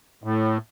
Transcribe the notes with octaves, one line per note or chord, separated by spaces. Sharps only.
A2